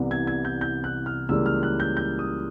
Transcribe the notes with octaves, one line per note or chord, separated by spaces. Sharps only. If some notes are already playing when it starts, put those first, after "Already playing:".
Already playing: C2 C3 E3 G3 B3
G#6
G#6
G6
G6
F#6
F6
C#2 C#3 E3 G3 A#3 E6
F6
F#6
G6
G6
D#6